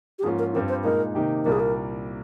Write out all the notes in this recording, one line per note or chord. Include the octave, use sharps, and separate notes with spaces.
G4
G#2 F3 A#3 C#4 F4 G#4
A#4
G2 G3 C4 F4 A#4
C5
A#2 G#3 D#4 A#4
C3 D#3 A#3 D#4 G4
C2 A#2 G3 A#3 A#4
G#4
A#4